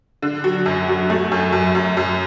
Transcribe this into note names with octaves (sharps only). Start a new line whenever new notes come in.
D3
F#3
F#2
F#3
A3
F#2
F#2
F#2
F#2